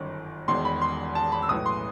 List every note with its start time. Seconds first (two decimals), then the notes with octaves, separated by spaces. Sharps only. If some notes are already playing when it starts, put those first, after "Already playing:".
Already playing: G1 F#2 D#3
0.48 E1 E2 D#3 C6
0.65 B5
0.82 C6
1.15 A5
1.32 B5
1.42 E6
1.49 B1 A2 E3 D#6
1.66 C6